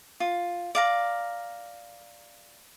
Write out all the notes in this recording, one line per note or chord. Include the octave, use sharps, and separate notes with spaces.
F4
D5 F5 A#5